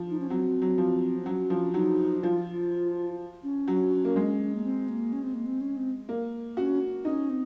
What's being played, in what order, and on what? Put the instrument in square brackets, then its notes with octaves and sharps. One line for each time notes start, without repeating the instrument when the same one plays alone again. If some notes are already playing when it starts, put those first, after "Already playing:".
Already playing: [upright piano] F3
[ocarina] D#4
C#4
[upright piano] F#3 [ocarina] C4
[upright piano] F#3
F3
[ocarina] C4
[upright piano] F#3 [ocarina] C#4
[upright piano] F3
[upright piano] F#3 [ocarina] D#4
[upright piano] F3 [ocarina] F4
[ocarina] C#4
[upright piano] F#3
A#3
G#3
[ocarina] A#3
C4
A#3
C#4
C4
A#3
C4
C#4
C4
[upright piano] A#3
[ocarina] C#4 [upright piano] F#4
[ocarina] C#4 [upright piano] D#4
[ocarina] C4